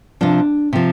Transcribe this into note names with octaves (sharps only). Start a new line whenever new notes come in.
C3 F3 D4
C3 F3